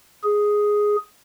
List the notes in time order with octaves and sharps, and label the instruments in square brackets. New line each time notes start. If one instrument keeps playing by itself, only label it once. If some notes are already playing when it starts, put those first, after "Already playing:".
[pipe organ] G#4